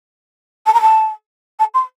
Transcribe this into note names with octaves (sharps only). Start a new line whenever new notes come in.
A5
A#5
A5
A5
C6